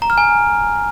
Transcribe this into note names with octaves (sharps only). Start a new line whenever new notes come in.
A#5
F6
G#5